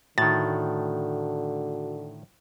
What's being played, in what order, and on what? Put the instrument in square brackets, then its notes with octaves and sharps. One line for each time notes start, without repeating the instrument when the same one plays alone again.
[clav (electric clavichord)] A2 D#3 [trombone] D3 [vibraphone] F#4 [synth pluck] A6